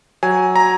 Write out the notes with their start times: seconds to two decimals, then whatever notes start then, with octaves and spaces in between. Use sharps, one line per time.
0.23 F#3 G#5
0.56 A#5